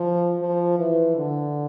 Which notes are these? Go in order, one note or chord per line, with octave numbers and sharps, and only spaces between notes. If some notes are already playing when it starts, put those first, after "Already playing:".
Already playing: F3
F3
E3
D3